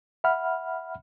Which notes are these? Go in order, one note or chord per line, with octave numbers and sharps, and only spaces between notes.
E5 F#5 B5 F6